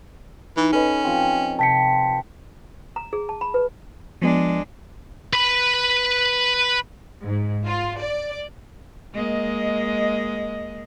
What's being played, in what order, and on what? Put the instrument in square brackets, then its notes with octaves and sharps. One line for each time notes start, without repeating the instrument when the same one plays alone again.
[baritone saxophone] E3 [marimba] D#4 [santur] A#5
[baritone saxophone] C#4 [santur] A4 B4 D#5
[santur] F3 C4
[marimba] C3 [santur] G5 [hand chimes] A5 B6 C#7
[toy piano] A#5
G#4
A5
B5
B4
[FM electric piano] F3 B3 [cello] G#3 D4
[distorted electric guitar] B4 B5
[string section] G#2
F4
D5
[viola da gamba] G#3 A#3 D#5